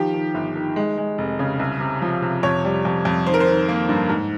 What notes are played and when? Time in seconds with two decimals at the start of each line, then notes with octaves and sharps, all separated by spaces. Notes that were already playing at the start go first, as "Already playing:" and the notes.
Already playing: D#3 F3 G4
0.14 D#3
0.34 G1
0.56 D#3
0.76 G#3
0.98 G#3
1.18 F1
1.39 C#3
1.59 C2
1.80 C3
2.02 F3
2.22 C3
2.43 F2 C#5
2.65 G3
2.85 F2
3.05 F2
3.27 D#3 C5
3.34 A#4
3.40 C5
3.47 D#3
3.68 A#3
3.89 G2
4.09 G#2